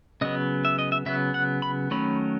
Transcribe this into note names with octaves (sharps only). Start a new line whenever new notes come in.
C#3 F#3 B3 D#5
E5
D#5
E5
C#3 F#3 B3 E5
F#5
B5
D#3 F#3 A3 C#4 B5